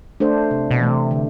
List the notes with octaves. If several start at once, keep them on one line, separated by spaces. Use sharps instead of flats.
A3 D4 A4 C5
C3
B2
E3 A3
C3
D3